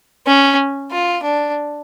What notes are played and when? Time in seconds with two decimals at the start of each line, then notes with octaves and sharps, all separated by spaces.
0.26 C#4
0.91 F4
1.23 D4